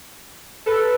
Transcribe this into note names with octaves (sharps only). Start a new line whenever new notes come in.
A4 B4